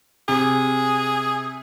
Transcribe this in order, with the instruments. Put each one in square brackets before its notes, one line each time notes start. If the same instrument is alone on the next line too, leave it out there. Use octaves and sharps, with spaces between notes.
[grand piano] C3 [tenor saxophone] G#4